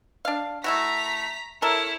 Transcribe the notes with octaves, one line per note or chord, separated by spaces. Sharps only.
D4 F5
A3 E4 F#4 A#5 B6
E4 A4 A#4 C#5